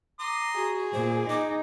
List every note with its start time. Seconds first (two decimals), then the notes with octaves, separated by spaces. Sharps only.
0.20 A#5 C6 D6 D#6
0.56 F#4 G#4
0.93 A#2 C5 D5
1.29 D#4 D6